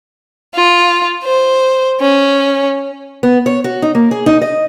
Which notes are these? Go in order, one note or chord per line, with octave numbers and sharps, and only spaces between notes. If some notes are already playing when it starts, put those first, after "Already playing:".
F4
C5
C#4
B3
C#5
F#4
D#4
A#3
G#4
D#4
D#5